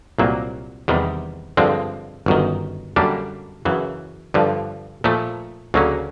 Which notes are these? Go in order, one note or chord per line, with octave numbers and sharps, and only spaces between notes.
C2 A#2 F#3 A#3
E2 C3 D#3 G3
G2 D3 F3 G#3 C4
G1 F#2 D#3
F#2 D3 G3 A#3 D4
F#2 C#3 E3
G2 D3 F3
A#2 F3 A3
D2 C#3 F#3 A#3 C#4